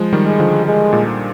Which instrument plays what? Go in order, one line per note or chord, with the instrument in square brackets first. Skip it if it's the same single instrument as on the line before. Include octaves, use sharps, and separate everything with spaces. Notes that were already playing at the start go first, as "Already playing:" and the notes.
Already playing: [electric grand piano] F3 G#3
D#3 G3
[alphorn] G#3
[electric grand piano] D3 F3
[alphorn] G#3
[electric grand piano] A#2